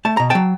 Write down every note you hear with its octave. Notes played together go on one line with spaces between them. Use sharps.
A3 A5
B2 A#5
F#3 G5 A5